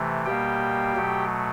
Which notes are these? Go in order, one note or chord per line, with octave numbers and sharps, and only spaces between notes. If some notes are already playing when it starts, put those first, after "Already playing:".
Already playing: C3 E3 A3
B2 G3 A#3 G4 G5
B2 F#3 A3